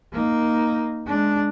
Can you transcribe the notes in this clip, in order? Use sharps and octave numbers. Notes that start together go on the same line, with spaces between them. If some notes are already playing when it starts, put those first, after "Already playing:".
A#3 D#4
G#3 D4